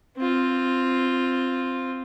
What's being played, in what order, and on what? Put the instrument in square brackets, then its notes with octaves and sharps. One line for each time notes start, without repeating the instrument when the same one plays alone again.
[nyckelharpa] C4 F4